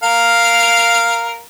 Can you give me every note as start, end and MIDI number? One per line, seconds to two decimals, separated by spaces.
0.03 1.41 70
0.03 1.41 77